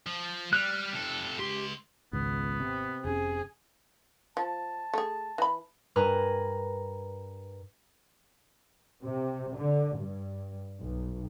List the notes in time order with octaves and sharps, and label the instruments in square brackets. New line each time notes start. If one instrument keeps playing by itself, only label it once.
[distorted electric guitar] F3
[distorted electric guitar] G3 [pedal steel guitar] F6 F#6
[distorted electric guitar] C3 A4
[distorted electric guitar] C#2 C6 [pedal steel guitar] G4
[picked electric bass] G#1 [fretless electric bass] C#2 [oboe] B3
[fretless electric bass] C3
[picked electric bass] F1 C#4 [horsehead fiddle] G#4
[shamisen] F3 [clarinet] A5
[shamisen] A3 G#4
E3 B5
[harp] G2 A#4 B4 G#5 A#5
[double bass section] C3
D3
G2
B1